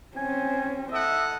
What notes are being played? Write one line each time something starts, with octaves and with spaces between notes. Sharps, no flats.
C4 C#4 G#5
E4 A4 D#5 E5 F#5